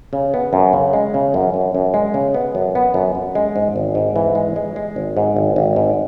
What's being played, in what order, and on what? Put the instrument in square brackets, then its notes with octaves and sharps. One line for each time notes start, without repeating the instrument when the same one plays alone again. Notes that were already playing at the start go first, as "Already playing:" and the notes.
[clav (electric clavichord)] C#3
B3
F#2
C#3
G#3
C#3
F#2
F#2
F#2
G#3
C#3
B3
F#2
B3
F#2
F#2
G#3
G#2
G#1
G#2
E3
G#3
G#3
G#3
G#1
G#2
G#1
G#1
G#2